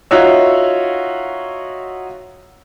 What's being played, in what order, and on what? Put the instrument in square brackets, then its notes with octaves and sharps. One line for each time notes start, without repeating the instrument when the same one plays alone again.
[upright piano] D#4 F4 F#4 C#5 E5 E6